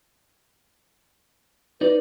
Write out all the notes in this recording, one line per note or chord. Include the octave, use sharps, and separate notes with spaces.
D#4 B4 D5